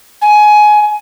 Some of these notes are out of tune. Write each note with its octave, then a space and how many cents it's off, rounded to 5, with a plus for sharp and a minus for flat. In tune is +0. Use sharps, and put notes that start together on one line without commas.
G#5 +20